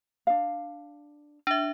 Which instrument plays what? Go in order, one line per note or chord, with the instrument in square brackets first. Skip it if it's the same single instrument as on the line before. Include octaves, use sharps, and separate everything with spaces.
[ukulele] D4 F5
[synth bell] D4 E5